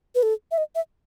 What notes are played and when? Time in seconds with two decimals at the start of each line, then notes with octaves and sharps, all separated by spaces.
0.15 B4
0.23 A4
0.51 E5
0.58 D#5
0.75 E5